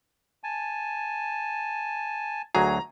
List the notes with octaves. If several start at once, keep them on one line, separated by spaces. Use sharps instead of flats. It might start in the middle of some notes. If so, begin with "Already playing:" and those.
G#5 A5
D2 F#3 G#4 A#5